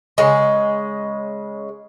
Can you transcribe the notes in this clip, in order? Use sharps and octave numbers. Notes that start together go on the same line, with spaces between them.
C#3 G#3